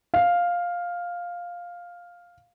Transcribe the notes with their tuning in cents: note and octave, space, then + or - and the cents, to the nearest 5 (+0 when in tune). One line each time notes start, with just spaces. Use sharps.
F5 +5